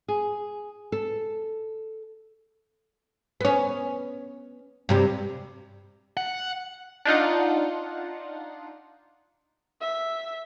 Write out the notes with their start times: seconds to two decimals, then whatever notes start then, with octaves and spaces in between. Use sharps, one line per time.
0.08 G#4
0.92 A4
3.41 B3 C#4
4.89 G2 C3 G3
6.17 F#5
7.05 D4 D#4 F4 F#5
9.81 E5